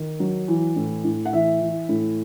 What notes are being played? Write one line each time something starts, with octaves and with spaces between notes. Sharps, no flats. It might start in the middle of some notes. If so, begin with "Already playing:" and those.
Already playing: D#3
F#3
E3
A2
A2
F#5
E3 E5
E3
A2